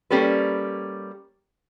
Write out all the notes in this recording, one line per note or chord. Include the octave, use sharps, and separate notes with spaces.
G3 A#3 C#4 G4 A4 B4